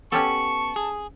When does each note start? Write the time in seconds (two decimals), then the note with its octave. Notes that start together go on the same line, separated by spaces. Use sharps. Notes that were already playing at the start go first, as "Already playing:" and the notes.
0.12 B3 C#4 G4 A4 A5 C#6
0.76 G#4